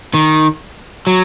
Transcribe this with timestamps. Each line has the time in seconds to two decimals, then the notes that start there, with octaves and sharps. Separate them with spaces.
0.14 D#3
1.07 F#3